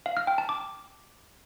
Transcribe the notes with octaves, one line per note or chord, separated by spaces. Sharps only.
F5
F6
G5
A5
D6